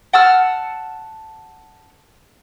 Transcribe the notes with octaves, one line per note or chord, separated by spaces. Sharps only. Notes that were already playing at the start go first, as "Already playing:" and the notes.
F#5 A5 E6 F6